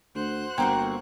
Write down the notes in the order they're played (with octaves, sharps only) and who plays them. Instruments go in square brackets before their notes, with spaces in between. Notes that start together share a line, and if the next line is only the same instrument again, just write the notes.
[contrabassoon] D2 [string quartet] C5 F#5 F#6
[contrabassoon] G1 [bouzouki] A#3 C4 F#4 [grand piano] G5